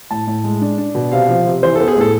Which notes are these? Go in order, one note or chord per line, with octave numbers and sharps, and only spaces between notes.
A2 A5
A2
G#3
D4
D4
B2
C3 F5
F3
C3
E3 C5
A4
B3
G#4
A2 A4